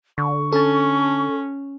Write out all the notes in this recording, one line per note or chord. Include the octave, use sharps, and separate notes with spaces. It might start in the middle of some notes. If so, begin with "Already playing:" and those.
D3 C#6
C#4 A4 A5